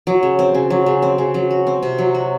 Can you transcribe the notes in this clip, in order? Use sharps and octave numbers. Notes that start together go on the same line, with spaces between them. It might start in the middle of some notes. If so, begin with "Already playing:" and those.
F#3
C#3
C4
C#3
F#3
C#3
C4
C#3
F#3
F#4
C4
C3
F#3
F#4